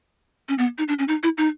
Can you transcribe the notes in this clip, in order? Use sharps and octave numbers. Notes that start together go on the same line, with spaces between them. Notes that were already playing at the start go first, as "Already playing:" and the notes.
C#4
B3
D#4
D4
C#4
D#4
E4
D#4